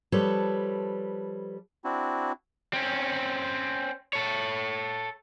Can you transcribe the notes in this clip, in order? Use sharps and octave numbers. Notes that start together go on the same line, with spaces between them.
F3 G3 A4 B4 C#5 A5
C4 D4 E4 F#4
C4 C#4
A4 C#5